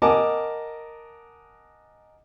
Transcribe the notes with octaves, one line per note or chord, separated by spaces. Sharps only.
A#4 D#5 F#5 G#5 A5 D6